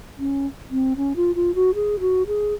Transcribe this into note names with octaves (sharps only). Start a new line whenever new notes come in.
C#4
C4
C#4
F4
F4
F#4
G#4
F#4
G#4